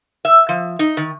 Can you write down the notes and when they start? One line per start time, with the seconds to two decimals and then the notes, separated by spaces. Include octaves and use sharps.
0.25 E5
0.49 F3
0.79 D#4
0.97 D#3